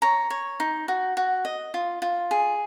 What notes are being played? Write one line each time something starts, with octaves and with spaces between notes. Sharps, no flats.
C#5 A#5
C#5
D#4
F#4
F#4
D#5
F4
F4
G#4